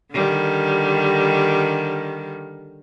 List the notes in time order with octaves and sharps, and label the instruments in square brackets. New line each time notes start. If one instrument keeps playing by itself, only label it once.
[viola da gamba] D3 D#3 G3